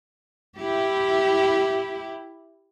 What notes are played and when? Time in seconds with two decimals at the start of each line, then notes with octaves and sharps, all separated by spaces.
0.57 E4 G4